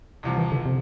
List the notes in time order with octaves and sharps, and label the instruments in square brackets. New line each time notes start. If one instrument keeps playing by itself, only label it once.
[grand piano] C2 C3 F3
[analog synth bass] E3
D3
C3